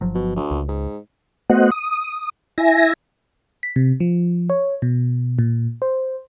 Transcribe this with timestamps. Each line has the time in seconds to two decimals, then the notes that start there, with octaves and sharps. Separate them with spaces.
0.01 G1 F3 F#3
0.15 B2
0.36 D2
0.51 C#2
0.68 G#2
1.50 A3 B3 F#4 C5 D#5 F#5
1.71 D#6
2.58 E4 E5 G#5 A#6
3.63 B6
3.76 C3
4.00 F3
4.50 C#5
4.82 B2
5.39 A#2
5.82 C5